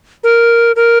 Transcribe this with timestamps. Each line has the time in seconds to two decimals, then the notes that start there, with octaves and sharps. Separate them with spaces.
0.23 A#4
0.76 A#4